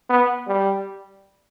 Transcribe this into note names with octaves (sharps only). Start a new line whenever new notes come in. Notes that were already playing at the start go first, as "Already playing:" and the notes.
B3
G3